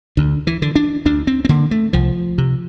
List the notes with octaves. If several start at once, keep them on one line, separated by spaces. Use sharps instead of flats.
D2 D3
E3
D3
D4
D2 D4
C4
C4
D3 A#3
A3
C2 F3
C3